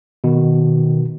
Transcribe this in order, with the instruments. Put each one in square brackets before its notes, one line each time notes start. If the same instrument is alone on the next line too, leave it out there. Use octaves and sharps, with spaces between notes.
[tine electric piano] B2 [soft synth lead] D#3